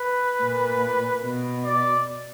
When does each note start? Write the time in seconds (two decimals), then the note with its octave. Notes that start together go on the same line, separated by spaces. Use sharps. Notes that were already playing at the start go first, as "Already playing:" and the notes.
Already playing: B4
0.42 A#2
1.24 B2
1.65 D5